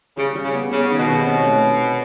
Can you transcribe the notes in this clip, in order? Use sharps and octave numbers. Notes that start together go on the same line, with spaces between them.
C#3 G3
G3
C#3
B3
C#3 B3
D#3
B2
C3
C#4
A3